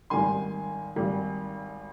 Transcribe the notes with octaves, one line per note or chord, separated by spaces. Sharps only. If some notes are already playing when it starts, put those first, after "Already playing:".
G#1 G#2 D#3 G3 G#5 C6
G#1 G#2 D#3 G3